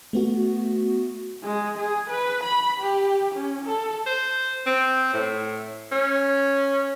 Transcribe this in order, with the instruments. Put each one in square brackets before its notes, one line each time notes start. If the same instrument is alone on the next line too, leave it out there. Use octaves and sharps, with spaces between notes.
[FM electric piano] A3 B3 F#4
[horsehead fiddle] G#3
G#4
B4
B5
G4
C#4
A4
[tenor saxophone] C5
C4
A2
C#4